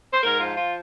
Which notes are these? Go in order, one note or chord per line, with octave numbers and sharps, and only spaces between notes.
C5
G#2 A#4
F3 F4
F4